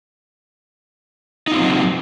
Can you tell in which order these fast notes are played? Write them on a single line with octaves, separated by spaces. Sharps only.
D#4 F4 C4 F#3